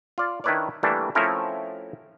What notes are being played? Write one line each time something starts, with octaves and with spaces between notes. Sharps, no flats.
F4 D5
D#3 D4 E4 B4 C#5 D5
E3 G3 A3 A#3 D4
F3 A3 C4 C#4 E4 A#4